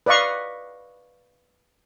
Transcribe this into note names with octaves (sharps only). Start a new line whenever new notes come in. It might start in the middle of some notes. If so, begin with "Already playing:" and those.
B4 D5 D#5 F5 C#6